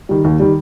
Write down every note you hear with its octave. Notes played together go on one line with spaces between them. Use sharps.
D#3 G3
D#2
D#3 G3